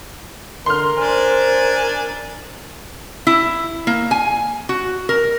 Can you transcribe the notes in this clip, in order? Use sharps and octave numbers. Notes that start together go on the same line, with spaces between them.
D3 A#4 C6 F6
D4 C5 G#5
E4
A#3
G#5
F#4
A#4